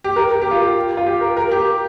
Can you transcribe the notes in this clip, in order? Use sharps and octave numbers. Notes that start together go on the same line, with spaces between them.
G4
A#4
A#4
G4
F4
G4
F4
G4
A#4
A#4
G4